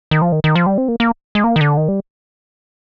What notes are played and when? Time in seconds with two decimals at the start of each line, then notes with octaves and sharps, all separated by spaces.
0.11 D#3
0.22 F3
0.32 D#3
0.44 D#3
0.56 F3
0.66 G3
0.78 C4
0.88 A#3
1.00 A#3
1.35 G#3
1.44 A#3
1.56 D#3
1.61 D3
1.77 D#3
1.88 G3